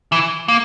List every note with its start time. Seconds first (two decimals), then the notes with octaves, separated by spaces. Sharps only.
0.12 E3
0.48 A#3